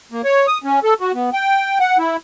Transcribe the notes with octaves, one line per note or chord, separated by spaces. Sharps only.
A#3
C#5
D#6
C#4
A4
F#4
B3
G5
F#5
E4